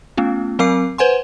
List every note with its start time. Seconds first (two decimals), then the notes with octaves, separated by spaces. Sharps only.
0.17 A3 B3 C#4 F4
0.59 F#3 C4 A#4 F5 D6 C7
0.98 B4 C5 F#5 G#5 C6